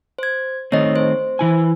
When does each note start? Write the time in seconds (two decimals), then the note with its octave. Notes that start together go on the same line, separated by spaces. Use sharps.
0.18 C5 G#6
0.72 D#3 A3 C4 C#5 D#5
0.96 C5
1.39 E3 E4 G#5